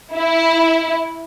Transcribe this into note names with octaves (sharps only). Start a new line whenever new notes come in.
E4